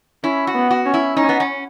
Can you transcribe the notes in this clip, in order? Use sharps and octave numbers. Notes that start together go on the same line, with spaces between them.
C#4 E4
F#4
B3
F#4
C#4
E4
C#4 D#4
B3
C#4